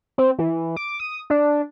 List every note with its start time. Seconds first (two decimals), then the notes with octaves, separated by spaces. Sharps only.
0.18 C4
0.39 E3
0.77 D6
1.00 D#6
1.30 D4